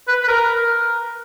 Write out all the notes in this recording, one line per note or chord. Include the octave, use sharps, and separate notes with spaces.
B4
B4
A#4